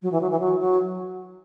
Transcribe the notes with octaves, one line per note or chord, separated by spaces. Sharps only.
F#3
E3
F#3
E3
F#3
F#3